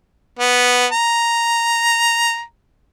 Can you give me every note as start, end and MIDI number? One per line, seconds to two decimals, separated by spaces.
0.39 0.86 59
0.92 2.42 82